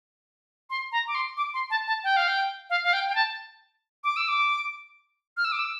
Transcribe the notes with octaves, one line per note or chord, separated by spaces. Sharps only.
C6
A#5
D6
C6
D6
C6
A5
A5
G5
F5
G5
F5
F5
G5
G5
A5
D6
E6
D6
F6
E6
D6
E6